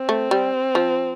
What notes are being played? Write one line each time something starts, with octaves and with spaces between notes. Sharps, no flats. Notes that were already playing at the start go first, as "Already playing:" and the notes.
Already playing: C4
A3
G3
F3